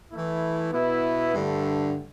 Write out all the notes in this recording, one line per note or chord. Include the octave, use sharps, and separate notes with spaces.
E3 A3 E4
B2 B3 E4
G2 D3 A3